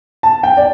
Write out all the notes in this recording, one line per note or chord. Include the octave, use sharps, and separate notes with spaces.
A5
G5
D5